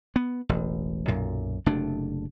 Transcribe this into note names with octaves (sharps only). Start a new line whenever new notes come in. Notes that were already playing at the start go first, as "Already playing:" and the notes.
B3
E1 A1
B1 F#2 A#2
F#1 C3 A3 D4